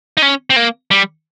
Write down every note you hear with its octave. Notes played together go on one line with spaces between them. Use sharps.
D#4
C#4
C4
A#3
G3